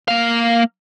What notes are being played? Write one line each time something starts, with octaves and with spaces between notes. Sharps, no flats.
A#3 F5